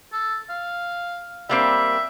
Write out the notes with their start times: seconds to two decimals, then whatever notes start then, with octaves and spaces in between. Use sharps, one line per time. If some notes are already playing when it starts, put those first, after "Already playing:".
0.13 A4
0.50 F5
1.49 G3 A#3 C4 E5